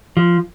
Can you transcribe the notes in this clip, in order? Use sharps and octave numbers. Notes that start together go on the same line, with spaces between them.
F3